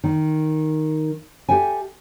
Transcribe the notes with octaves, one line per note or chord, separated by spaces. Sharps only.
D#3
G4 A4 E5 G5 G#5